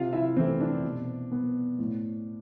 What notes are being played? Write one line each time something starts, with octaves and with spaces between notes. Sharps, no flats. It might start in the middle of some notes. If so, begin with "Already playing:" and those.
Already playing: C3 F4 F5
E4 E5
E3 A3 C4 C5
D4
B2
B3
A2